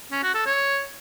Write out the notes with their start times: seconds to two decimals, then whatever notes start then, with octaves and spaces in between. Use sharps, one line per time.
0.12 C#4
0.23 F#4
0.35 A4
0.46 C#5